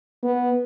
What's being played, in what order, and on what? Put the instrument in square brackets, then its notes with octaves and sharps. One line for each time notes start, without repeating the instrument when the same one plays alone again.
[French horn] B3